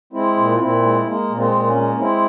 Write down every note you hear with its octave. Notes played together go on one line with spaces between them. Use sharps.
G#3 C4 E4
A#2
F4
A#2 C4 E4
G#3
C4
G#3 A#3
A#2
G#3 C4
A#2
A#3 C#4
G#3
G#3 C4 E4